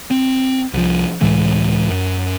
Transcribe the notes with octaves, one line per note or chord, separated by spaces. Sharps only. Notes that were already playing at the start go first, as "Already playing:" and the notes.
C4
C2 F3
C#2 A2 E3 G#3
F#2